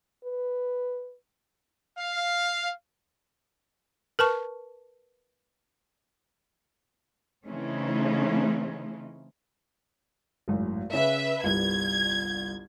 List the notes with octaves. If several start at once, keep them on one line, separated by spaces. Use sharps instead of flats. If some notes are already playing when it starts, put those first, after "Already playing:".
B4
F5
A#4 B4 A5 C#6
C#3 E3 A3 C4 C#4 D#4
G#1 F#2 A2
C#3 C#4 B4 E5
G1 C2 G3 G#6